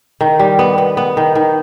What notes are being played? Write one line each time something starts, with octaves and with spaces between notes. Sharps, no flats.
D#3
G3
B3
B3
B3
D#3
D#3